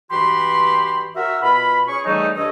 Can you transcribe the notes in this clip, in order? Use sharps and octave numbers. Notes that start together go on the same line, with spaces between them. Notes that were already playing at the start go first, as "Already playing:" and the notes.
G2 E3 F#4 G4 B5 C6
F#4 A#4 E5
B2 F4 B5
C#4 G#4 C#6
C#3 E3 G3 A3 D#4
G2 D4 A4 C#5 D#5